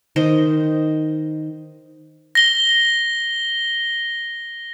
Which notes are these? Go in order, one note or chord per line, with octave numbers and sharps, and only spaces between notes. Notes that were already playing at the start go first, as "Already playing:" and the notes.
D#3 C5 D#5
A#6 G7